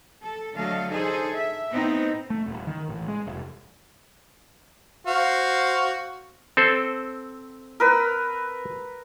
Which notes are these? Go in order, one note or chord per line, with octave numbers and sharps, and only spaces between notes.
A4
D3 F#3 A3 A4 D#5 F5
D#4 G#4 A4 C5
E5
A2 B3 C4 D#4
A3
D#1
D#3
A1
G#3
F1
F#4 C5 F5
C4 A4 C5
A#4 B4 E6